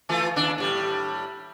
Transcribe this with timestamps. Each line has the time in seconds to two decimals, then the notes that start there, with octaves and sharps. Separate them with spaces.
0.09 E3 A3 F4
0.36 D#2 D4
0.58 A2 G3